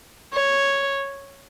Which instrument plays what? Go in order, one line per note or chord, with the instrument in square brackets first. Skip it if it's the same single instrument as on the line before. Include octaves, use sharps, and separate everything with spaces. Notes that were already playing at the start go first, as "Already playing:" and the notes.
[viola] C#5